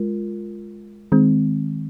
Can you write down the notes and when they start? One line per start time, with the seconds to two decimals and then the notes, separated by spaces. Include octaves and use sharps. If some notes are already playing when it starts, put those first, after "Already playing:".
Already playing: G#3 F4 A#4
1.12 D#3 G#3 C4